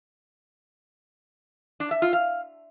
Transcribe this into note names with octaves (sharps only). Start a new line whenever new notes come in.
D4
E5
F4
F5